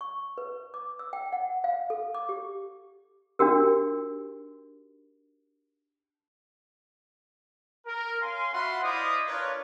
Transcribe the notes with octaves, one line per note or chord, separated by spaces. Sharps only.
C#6
B4
D6
E6
G5
F#5
F5
A4
D6
G4
D4 D#4 F#4 G4 A#4
A#4
C#4 F5 G#5 C6
F4 F#4 E5 F#5 B5 C6
E4 C5 D5 D#5 F5 D#6
D4 F4 A#4 B4 C#5